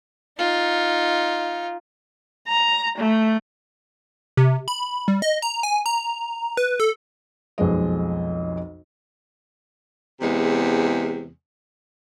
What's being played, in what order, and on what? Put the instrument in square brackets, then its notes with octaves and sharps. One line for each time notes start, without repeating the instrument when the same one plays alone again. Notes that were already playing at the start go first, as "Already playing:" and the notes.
[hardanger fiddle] D#4 F4
[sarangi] A#5
A3
[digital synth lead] C3
B5
G3
D#5
A#5
G#5
A#5
B4
A4
[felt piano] B1 F2 F3 G#3 D#5
[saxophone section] E2 C3 G#3